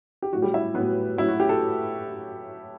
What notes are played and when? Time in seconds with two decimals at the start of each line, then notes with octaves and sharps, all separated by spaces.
0.22 G4
0.32 A2 F#3 F#4
0.42 G3 G4
0.54 E4 E5
0.74 A2 F#3 B3 B4
1.18 A2 F#3 E4
1.28 F#4
1.40 G4
1.49 A4